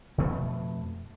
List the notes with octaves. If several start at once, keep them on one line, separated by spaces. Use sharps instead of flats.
F2 B2 A3 B3